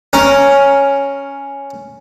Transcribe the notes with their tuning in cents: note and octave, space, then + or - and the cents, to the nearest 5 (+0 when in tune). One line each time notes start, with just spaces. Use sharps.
C#4 +0 A#4 +0